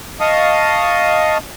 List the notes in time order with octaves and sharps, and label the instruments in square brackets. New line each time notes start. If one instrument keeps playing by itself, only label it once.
[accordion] D#5 F5 A5 C#6 D#6